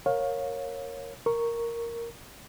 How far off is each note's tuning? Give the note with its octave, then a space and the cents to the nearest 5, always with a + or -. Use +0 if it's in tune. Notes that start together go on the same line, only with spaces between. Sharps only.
A#4 +0 C#5 -10 F5 +20
A#4 +0 C#6 +0